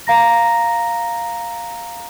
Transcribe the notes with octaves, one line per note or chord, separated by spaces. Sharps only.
F5 A#5 A#6